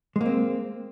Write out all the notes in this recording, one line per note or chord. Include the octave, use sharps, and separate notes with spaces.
G#3 A#3 C4